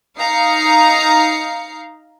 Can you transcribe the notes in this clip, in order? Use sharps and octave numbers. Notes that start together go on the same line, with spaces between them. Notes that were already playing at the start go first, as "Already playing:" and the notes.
D#4 F5 A#5 C7 C#7